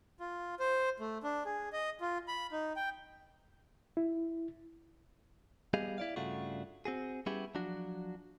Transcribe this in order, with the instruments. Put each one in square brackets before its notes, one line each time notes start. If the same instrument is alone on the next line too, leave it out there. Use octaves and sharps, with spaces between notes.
[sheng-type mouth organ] F4
C5
A3
D4
G#4
D#5
F4
B5
D#4
G5
[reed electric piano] E4
[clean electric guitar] G3 B3 G4 G#4 D#5 F5
E4 D5 F5
G2 C#3 A3 D4 F4 F#4
C4 F#4 G#4
G3 B3 C#4 E4 G4 G#4
F3 F#3 D4 F#4